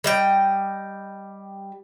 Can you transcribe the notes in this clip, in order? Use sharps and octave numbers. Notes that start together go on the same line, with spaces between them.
G3 D#5 G5